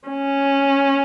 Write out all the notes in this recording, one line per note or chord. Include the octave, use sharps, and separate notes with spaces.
C#4